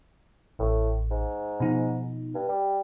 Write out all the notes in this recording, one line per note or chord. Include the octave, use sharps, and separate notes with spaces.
A1 A2
G#2
B2 F3 D#4
G2
G3